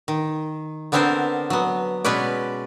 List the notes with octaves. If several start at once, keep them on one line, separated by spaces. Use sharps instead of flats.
D#3
D3 B3 C4 D4 A#4 C5
F#3 B3
B2 G#3 C#4 B4 D5